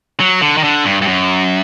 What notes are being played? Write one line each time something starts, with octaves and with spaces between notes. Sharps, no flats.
F#3
D3
D#3
D3
G2
G2
F#2